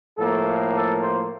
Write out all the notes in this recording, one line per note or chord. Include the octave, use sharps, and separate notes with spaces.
A2 F3 A#3 A4
A4
C5